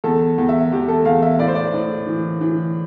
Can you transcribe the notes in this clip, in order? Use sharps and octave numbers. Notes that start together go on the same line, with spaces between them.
E2 A4
E2
E5
E2 G4
A4
E2 F5
E5
A2 D5
C5
D5
A2
E3
E3